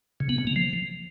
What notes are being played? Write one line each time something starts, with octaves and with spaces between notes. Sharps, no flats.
C#3
B3
C#3
A#3
F3